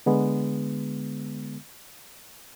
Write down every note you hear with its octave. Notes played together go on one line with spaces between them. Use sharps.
D3 G#3 B3